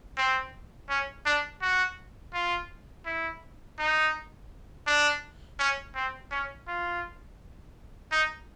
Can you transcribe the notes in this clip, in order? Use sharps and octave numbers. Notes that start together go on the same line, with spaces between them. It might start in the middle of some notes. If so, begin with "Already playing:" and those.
C4
C#4
D4
F#4
F4
E4
D#4
D4
C#4
C4
C#4
F4
D#4